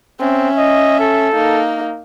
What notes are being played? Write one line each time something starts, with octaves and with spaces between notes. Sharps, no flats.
C4 C#4 E5
D#5
A4
A#3 D#4